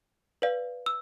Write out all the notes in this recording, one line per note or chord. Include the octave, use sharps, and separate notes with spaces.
B4 D5 F5
E6